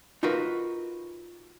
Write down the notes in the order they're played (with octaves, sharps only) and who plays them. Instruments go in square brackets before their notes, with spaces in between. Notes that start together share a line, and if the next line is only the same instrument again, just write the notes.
[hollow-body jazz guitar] D#4 F4 F#4 A#4 B4